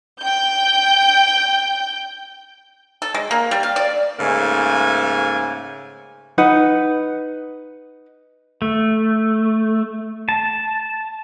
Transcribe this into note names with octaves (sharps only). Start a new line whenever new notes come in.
G5 G6
A4
G#3
A#3
G3
F5
D5
G#2 C#3 A3 A#3 G#5
D#4 B4 F#5
A3
A5